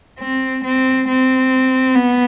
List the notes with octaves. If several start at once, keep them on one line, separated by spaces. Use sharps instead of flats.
C4
C4
C4
B3